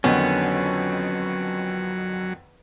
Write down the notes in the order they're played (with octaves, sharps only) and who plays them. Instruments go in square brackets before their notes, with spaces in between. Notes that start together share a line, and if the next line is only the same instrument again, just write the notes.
[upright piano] F2 D3 D#3 [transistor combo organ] F#3 [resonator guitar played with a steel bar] B3 [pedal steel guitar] C#4